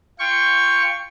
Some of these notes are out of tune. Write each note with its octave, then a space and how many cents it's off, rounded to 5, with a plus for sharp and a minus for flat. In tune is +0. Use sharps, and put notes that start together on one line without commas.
F4 -15 G5 +15 C#6 +0